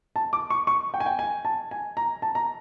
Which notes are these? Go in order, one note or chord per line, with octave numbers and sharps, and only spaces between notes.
A5
D6
C#6
C#6
G5
G#5
G5
G#5
A5
G#5
A#5
A5
A#5